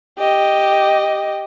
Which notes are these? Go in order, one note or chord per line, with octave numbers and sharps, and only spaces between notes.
G4 D#5